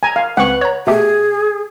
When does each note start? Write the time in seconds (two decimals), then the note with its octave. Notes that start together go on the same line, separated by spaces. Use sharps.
0.03 G#5 A#5
0.16 F5
0.37 C#2 C4 B4 F#5 C#6
0.61 C#5 A#5
0.87 B2 A3 G4 G#4